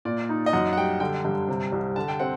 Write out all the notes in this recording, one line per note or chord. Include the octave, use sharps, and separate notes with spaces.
A#2 D5
D#4
D#5
F#2 F#5
F#5
G3 G5
D3 G5
G2
C3
C2
D3 A5
G5
C4 F#5